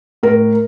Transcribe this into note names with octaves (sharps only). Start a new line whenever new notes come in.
A2 A#4